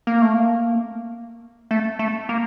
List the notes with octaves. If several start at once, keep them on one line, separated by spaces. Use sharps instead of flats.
A#3
A3
A#3
A3
A3
A#3